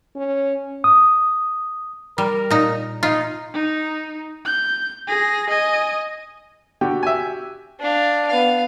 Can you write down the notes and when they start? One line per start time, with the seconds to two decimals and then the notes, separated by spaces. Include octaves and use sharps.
0.16 C#4
0.84 D#6
2.18 G3 A#4
2.50 A#2 D#4
3.03 D#4 F4
3.54 D#4
4.45 G6
5.07 G#4 A#6
5.49 D#5 G#5
6.81 D3 F#4 G4 G5
7.03 E5 G#5
7.80 D4 F5
8.27 B3 F5